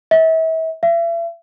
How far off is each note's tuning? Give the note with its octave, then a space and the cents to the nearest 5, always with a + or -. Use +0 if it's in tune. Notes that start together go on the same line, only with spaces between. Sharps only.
E5 -35
E5 +40